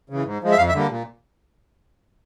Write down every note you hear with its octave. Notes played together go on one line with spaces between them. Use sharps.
C#3 E3
G#2
F3 G#3
E5
F2 F5
E5
D3 G3 A#3
A#2